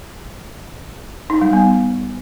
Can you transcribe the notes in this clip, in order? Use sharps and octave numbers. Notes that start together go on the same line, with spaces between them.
D#4
G3
B3